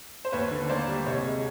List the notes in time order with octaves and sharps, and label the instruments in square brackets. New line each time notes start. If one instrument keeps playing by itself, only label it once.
[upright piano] C5
D#2 B4 C#5
D3
A#3 C5 D5
G3
C2 C#5 D#5
G#3